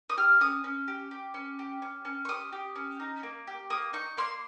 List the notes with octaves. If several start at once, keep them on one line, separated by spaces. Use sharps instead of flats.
D#6
G4 F6
C#4 D#6
C#4
G4
G4
C#4
G4
C#4
C#4
C#6
G4 D#6
G4
C#4
D#4
A#3
G4
A#3 D#6
D#4 C#6
A#3 C6